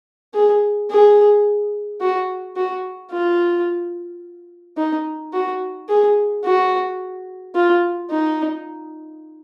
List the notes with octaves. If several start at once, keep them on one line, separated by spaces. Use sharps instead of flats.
G#4
G#4
F#4
F#4
F4
D#4
F#4
G#4
F#4
F4
D#4